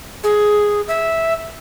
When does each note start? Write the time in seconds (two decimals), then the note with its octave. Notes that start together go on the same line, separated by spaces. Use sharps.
0.24 G#4
0.88 E5